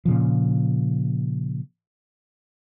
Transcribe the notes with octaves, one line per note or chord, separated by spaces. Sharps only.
A#2 C#3 F3